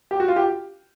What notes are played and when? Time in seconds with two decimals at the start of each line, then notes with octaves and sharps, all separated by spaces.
0.11 G4
0.20 F#4
0.28 F4
0.36 G4